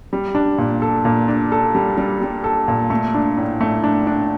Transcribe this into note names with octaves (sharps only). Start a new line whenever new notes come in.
G3
D4
A#2
A4
A#2
D4
A4
G3
G3
G3
A4
A#2
A3
D4
A2
A3
D4
D4